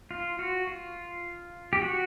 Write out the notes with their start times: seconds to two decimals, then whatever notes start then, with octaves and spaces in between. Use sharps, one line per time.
0.11 F4
0.39 F#4
0.67 F4
1.73 G4
1.82 F#4